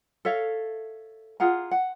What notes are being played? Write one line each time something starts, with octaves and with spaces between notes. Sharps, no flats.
A4 C#5 E5 F5
F4 G#4 F#5 A#5
F#5